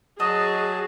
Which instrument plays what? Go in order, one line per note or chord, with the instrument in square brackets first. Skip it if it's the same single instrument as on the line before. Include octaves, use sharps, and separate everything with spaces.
[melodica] F#3 F#4 A5 [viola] G#4 [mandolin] D#5